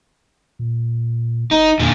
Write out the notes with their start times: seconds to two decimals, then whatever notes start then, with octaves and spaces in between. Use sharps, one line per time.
0.59 A#2
1.51 F#1 D#4
1.79 E2 A#2 D3